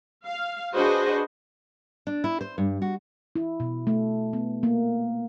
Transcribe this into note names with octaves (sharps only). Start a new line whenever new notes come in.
F5
D4 F#4 G#4 B4 C5 D#5
D4
E4
C5
G2
F#4
E4
B2
A3
B3
A#3